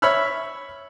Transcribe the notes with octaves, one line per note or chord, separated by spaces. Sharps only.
C#5 E5 B5 E6 F6